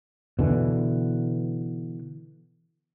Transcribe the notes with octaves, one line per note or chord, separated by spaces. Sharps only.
B2 D3 E3